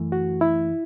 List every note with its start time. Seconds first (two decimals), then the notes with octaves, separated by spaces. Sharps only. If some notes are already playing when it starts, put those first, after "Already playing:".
Already playing: F#2 E3 A3
0.12 F#4
0.41 E4